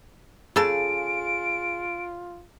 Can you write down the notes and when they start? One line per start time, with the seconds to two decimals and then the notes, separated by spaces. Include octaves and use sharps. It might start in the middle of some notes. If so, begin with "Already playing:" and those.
0.56 C#3 F4 G#4 A4 A5 D7